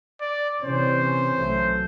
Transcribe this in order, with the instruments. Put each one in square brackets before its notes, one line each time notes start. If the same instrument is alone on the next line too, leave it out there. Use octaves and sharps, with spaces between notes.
[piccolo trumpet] D5
[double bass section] C3 E3 C#4 [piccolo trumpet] C5
[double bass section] B1 F#3 A3